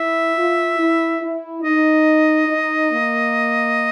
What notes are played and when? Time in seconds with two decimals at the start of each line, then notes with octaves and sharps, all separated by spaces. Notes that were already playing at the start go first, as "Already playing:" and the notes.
Already playing: E4 E5
0.36 F4
0.78 E4
1.20 E4
1.63 D#4 D#5
2.48 D#4
2.90 A#3